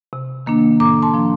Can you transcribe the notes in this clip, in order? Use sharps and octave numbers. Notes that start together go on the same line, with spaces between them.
C3
D#3 A#3 D4
A2 A#5 D6
A5 C6
F3 A#3 D4